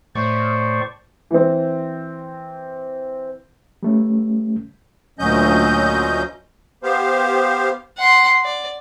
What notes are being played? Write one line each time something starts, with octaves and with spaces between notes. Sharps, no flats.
A2 C5 D5 C#6
E3 C4
G3 A3 C#4
D2 A#2 F#3 C#4 D#5 G6
B3 G4 C5 F5
F#5 C6
D5